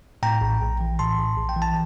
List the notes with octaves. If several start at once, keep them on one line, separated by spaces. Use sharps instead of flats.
A2 G5 A#5
A#1
A#1
E3
A2 A5 C6
A#1
A#1
G5
E3
A5